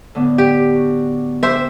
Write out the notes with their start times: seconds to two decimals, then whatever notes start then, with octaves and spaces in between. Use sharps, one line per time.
0.15 A2 D3 B3
0.38 G4
0.75 D4 F#4
1.43 G4 C5 E5